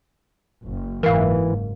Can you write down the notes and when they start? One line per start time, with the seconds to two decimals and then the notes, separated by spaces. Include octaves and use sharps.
0.62 F#1
1.03 F#1 G#2 E3 A#4 F5